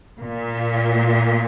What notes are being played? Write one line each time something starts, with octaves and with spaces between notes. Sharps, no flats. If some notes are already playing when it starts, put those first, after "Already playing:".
A#2